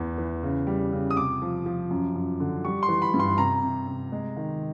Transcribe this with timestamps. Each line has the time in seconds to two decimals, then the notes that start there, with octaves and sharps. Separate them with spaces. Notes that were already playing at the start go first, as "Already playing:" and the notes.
Already playing: E2 E3
0.18 E3
0.43 C#3
0.67 G3
0.92 C#3
1.11 D#6
1.16 C3 D6
1.42 F3
1.66 F3
1.91 F#2
2.16 F#2
2.40 D3
2.64 G3 C#6
2.83 C6
2.88 E3
3.02 B5
3.14 G2
3.20 C6
3.38 C3 A#5
3.63 C3
3.87 C3
4.12 G#3
4.37 D#3